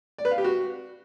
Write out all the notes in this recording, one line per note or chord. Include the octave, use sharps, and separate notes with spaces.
D5
B4
F5
G4
F#4